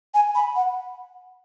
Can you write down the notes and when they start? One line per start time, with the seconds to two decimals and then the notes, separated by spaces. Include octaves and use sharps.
0.14 G#5
0.35 B5
0.56 F#5